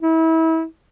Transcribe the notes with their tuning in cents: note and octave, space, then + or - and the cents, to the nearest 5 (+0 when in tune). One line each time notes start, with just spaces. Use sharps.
E4 -30